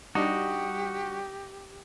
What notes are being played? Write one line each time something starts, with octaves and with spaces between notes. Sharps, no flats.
G3 D4 D#4 F#4 G4